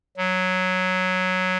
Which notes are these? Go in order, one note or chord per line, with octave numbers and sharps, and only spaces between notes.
F#3